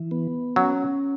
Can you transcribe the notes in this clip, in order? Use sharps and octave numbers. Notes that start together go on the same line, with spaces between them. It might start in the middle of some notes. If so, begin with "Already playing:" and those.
Already playing: E3
B3
F#3 C#4